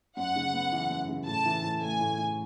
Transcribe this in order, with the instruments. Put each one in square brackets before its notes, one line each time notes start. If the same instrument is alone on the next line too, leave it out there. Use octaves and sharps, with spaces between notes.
[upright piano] F#2 [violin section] F#5
[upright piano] C#3
B3
E3
F#2
C#3
[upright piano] A2 [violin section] A5
[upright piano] E3
A2
[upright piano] A3 [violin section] G#5
[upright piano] A2
E3